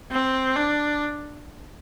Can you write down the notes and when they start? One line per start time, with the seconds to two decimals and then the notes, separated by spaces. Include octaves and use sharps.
0.11 C4
0.56 D4